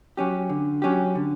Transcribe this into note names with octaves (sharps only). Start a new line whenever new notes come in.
F#3 C#4 G4
D3
F#3 C#4 G4
D3